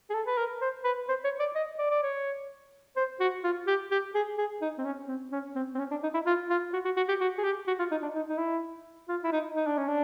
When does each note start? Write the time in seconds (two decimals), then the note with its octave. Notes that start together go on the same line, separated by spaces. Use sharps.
0.10 G#4
0.14 A4
0.26 B4
0.37 A#4
0.61 C5
0.84 B4
1.09 C5
1.24 C#5
1.40 D5
1.55 D#5
1.79 D5
1.91 D5
2.03 C#5
2.96 C5
3.20 F#4
3.44 F4
3.67 G4
3.91 G4
4.14 G#4
4.38 G#4
4.61 D#4
4.78 C4
4.85 C#4
5.08 C4
5.32 C#4
5.55 C4
5.75 C4
5.79 C#4
5.91 D4
6.03 D#4
6.14 E4
6.26 F4
6.50 F4
6.73 F#4
6.85 F#4
6.96 F#4
7.08 G4
7.20 F#4
7.38 G#4
7.44 G4
7.67 F#4
7.79 F4
7.91 D#4
8.02 D4
8.15 D#4
8.29 D#4
8.38 E4
9.09 F4
9.24 E4
9.32 D#4
9.55 D#4
9.66 D4
9.77 C#4
9.88 D4